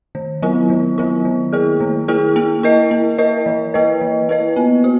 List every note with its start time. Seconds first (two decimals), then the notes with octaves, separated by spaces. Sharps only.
0.15 D#3
0.42 F#3 B3 E4
0.70 D#3
0.98 F#3 B3 E4
1.25 D#3
1.53 A#3 E4 G#4
1.80 D#3
2.08 A#3 E4 G#4
2.36 A#3
2.63 E4 A#4 D#5
2.91 A#3
3.18 E4 A#4 D#5
3.46 E3
3.74 A#3 E4 B4 D#5
4.01 E3
4.29 A#3 E4 B4 D#5
4.56 B3
4.84 F#4